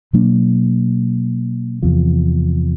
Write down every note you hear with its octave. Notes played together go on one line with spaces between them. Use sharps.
B2 F#3 A#3 D4
E2 C3 F3